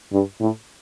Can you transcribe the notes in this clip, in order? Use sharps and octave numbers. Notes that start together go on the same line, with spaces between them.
G2
A2